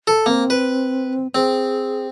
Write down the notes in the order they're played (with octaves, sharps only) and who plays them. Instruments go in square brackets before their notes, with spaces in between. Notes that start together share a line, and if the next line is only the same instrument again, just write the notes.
[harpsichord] A4
[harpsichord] A#3 [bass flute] C4
[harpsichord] B4
[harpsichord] C4 [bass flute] G#4